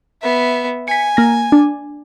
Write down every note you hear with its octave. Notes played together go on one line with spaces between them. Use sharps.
B3 E5
G#5 B6 C#7
A#3 A#6
D4